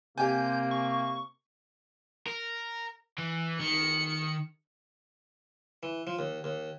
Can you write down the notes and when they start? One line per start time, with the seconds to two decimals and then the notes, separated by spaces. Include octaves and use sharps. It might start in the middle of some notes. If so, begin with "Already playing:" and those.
0.18 C3 A#3 G4 G#5 G6
0.71 C#6
2.26 A#4
3.18 E3
3.60 D#3 C#7
5.83 E3
6.07 F3
6.19 D#2
6.44 D#2